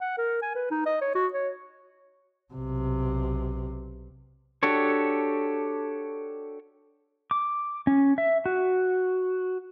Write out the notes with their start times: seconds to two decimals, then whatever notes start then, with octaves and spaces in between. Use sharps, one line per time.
0.01 F#5
0.18 A#4
0.42 G#5
0.55 B4
0.71 D#4
0.86 D#5
1.01 C#5
1.15 F#4
1.33 C#5
2.54 B1 C3
4.63 D4 F#4 G4 A4 C#5
7.31 D6
7.87 C#4
8.18 E5
8.46 F#4